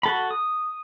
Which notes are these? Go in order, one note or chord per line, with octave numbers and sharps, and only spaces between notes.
F#4 A4 B5
D#6